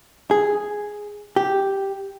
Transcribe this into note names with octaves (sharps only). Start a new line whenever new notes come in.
G#4
G4